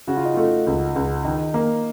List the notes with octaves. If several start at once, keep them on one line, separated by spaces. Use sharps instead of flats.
C#3 F#4
F4
D#4
A3 F4
C#2
C#2
D#3 D#4
A#3